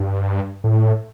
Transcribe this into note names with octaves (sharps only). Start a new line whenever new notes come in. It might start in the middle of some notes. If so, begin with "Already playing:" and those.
Already playing: G2
A2